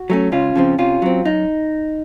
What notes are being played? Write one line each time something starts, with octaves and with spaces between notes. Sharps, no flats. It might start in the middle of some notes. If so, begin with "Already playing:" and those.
Already playing: F#4
F#3 A3 C#4
C#2 C#4 F4
C#3 F3 C4
C3 C#4 F4
F#3 C4
F#2 D#4